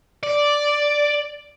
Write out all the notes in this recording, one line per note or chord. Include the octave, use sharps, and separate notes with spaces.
D5